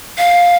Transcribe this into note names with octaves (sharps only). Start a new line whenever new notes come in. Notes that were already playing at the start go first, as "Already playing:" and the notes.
F5